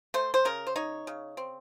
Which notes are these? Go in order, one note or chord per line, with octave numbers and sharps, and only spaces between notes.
A3 C5
C5
C#3 A#4
C5
D#4 C#5
C#3
C4